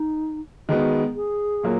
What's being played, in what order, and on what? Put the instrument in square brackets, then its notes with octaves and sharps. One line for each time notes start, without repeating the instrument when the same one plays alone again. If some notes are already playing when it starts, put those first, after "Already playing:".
Already playing: [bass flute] D#4
[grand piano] D#3 G#3 B3 [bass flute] F#4
[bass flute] G#4
[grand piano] A#2 F#3 A#3